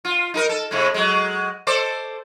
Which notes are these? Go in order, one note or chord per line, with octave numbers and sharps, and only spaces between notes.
F4
D#4 G#4 A#4
A4
A2 C3 G#3
F#3 G#3
A4 C5 D5